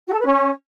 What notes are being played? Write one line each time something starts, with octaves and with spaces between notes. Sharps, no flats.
F#4
A4
B4
C#4